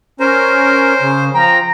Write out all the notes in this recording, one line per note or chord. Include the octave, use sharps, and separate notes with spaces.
C#4 A#4 C5
C#3
F3 G5 A#5